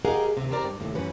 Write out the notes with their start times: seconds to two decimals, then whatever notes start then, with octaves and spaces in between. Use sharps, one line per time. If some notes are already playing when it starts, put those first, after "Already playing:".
0.05 G4 G#4 A#4 D#5 F5 F#5
0.37 D#2 C3
0.50 E2 C4 G4 A#4 D5 A#5
0.64 G2
0.80 D#2 A2 C3
0.95 F#2 E3 C#4 B4